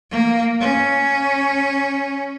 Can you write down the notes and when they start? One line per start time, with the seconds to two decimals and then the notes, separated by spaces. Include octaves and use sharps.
0.11 A#3
0.60 C#4